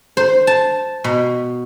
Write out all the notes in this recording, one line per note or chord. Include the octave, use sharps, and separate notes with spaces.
C5
A5
B2